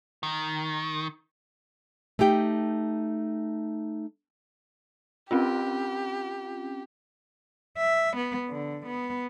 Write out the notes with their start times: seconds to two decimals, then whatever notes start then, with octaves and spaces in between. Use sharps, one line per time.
0.23 D#3
2.19 A3 D#4 G4 G5
5.31 C4 C#4 F4 G4
7.78 E5
8.17 B3
8.49 D3
8.87 B3